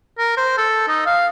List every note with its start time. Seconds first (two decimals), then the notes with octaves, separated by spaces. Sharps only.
0.18 A#4
0.37 C5
0.58 A4
0.88 D#4
1.06 F5